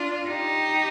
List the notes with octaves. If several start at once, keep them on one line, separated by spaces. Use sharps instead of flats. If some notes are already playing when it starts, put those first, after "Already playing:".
Already playing: D4 F4
D#4 G4